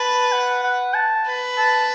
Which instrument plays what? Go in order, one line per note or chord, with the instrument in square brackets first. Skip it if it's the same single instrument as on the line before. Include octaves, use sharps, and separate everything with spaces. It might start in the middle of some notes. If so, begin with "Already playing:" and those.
Already playing: [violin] B4 [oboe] A5
[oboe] F#5
F#5
A5
[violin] B4
[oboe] A5